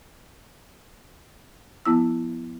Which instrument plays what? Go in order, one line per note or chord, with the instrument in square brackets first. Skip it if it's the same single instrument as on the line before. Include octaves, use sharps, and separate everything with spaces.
[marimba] F3 B3 E4 E6